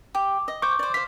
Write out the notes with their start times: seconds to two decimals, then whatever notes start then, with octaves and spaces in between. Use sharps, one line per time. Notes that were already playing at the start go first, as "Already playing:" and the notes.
0.15 G4
0.48 D#5
0.62 C5 C#6 D6 G6
0.79 C5 D5
0.94 C5 F5 B6